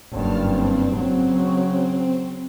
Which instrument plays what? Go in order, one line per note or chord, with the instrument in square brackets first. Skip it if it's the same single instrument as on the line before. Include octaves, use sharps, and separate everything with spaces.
[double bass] F#1 G2 [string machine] A5 F6
[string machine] C4
[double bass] C#3 F#3